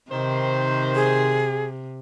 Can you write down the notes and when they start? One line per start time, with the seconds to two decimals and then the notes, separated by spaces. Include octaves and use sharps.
0.11 C3 D#3 C5
0.95 G#4